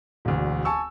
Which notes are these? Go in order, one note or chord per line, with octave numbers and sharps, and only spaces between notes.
E1 D2
G#5 A5 C#6 E6